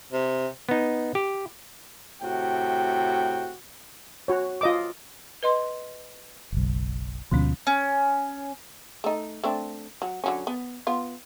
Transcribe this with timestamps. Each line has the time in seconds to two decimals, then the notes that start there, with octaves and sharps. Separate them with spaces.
0.12 C3
0.69 B3 D#4
1.15 G4
2.22 A2 C3 F#4 G5
4.28 F#4 C#5
4.61 F4 D#5 D6
5.43 B4 D#5 C6
6.52 F#1 B1
7.31 D2 B2 D3 F3 G#3 C#4
7.67 C#4
9.04 A3 D#4
9.44 A3 C4 D4
10.02 F#3
10.24 D3 F#3 C#4
10.47 B3
10.87 B3 F4